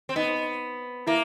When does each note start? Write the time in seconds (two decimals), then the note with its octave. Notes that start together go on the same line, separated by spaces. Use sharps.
0.09 C4
0.16 B3 D#4 D#5
1.07 A#3 E4 E5